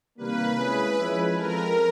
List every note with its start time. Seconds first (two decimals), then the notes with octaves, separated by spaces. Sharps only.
0.18 C3 D#3 G3 A#3 B4
0.56 G#3 C#4 E4 G#4
0.95 F3 G#3 C#4 E4
1.35 F3 G#3 C4 F4 A4 A#4